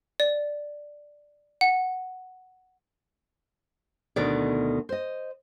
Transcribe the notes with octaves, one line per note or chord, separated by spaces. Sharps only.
D5
F#5
D2 B2 D#3 A3 D5
C5 D#5